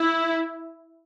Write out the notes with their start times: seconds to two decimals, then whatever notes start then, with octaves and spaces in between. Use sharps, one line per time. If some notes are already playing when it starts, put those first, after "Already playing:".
Already playing: E4